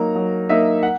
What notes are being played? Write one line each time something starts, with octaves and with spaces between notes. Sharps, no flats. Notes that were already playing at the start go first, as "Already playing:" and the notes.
Already playing: F#3 A#3 D#4 A#5
F#3
A#3 D#4 E5
F#5